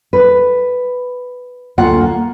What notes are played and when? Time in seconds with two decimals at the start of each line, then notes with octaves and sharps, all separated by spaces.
0.13 B4
1.78 D2 A#3 F4 F#5
2.01 A#3